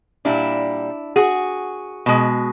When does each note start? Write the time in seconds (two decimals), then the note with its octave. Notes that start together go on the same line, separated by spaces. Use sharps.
0.25 A#2 G3 D4 E4
1.16 F#4 G#4
2.06 B2 G#3